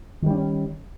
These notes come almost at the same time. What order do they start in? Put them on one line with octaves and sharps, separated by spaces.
D#3 G3 D4 C#4